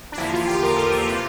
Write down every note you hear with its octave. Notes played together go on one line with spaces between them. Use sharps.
D4
E2 D3 F3 A#3 E4
F4
G4
A#4
A4
A4
C3 E3 F4